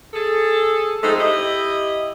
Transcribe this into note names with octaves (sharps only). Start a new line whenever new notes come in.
G#4 A4
F3 G#3 A3 C4 D#4
E4 G4 D#5